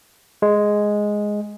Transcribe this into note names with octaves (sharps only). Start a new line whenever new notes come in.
G#3